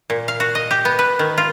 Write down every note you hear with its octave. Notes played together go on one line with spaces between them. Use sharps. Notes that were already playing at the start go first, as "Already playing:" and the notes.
A#2
F5
F#4
D#5
G4
B3
B4
D#3
F4